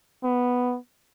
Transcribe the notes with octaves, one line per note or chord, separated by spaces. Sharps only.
B3